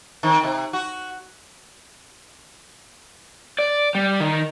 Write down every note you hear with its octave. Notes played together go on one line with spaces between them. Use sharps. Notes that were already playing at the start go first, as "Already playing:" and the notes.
D#3 C4
C3
F#4
D5
G3
D#3